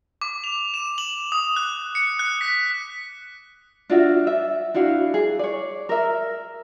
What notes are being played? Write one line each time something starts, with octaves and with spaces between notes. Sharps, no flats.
D6
F7
E7
F#7
D#6
F#6
C#7
F#6
B6
D4 F4 F#4 E5
E5
D4 E4 F#4 F5
G#4
C#5 D5
A#4 E5